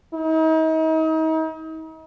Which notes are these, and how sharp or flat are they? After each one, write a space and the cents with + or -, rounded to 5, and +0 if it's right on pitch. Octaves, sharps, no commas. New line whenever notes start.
D#4 +40